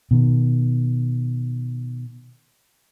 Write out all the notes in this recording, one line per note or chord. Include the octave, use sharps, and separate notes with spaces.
B2 D#3